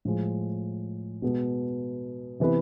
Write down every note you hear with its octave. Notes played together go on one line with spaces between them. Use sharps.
A2 F3 G#3
B2 G#3 B3
C3 E3 B3 E4 B4